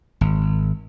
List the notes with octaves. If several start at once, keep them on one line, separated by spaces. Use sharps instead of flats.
G#1